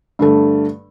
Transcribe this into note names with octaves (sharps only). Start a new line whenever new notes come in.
G2 D3 A3